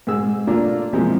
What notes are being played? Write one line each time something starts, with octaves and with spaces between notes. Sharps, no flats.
G#2 G#4 E6
A3 A#3 D4 F4 A4
C3 E3 F3 G#3 A#3